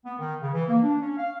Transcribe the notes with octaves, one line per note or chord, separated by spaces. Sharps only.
B3
D#3
C#3
E3
A#3
D4
C#4
F5